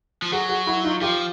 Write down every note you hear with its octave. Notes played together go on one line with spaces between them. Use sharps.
F3
F#3 F#4 G#4
F#4 G#4
E4 F#4
D#4 F4
F3 F4 G4